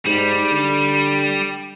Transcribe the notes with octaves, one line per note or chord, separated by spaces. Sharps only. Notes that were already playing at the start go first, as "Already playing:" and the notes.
G#2 G3
D3